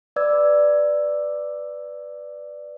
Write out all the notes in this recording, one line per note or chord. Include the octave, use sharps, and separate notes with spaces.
B4 D5 D6 E6 G#6